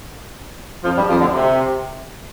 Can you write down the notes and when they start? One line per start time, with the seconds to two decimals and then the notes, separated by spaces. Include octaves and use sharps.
0.84 F2 F3
0.95 G2 G3
1.08 F2 F3
1.19 D2 D3
1.31 C3